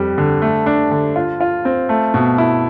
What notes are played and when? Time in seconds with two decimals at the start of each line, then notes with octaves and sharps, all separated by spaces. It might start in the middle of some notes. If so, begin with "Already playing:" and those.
Already playing: F2 G3
0.18 D3
0.42 A3
0.66 D4
0.91 D3
1.16 F4
1.40 F4
1.65 C4
1.89 A3
2.14 B2
2.38 E4